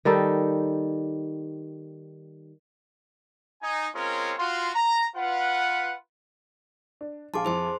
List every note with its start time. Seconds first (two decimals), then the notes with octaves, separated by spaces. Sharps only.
0.05 D#3 G3 D#4 A4
3.62 D#4 G#5
3.95 G#3 C4 C#4 F4 A#4 C#5
4.38 F4 F#4 C6
4.74 A#5
5.15 F4 B4 F#5
7.01 D4
7.34 A#1 G#4 F5 A5 C6 D6
7.45 F2 E4 G#4 C5 C6